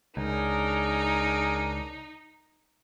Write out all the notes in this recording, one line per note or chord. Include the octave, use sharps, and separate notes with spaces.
C#2 D4 D#4 G#4 A#4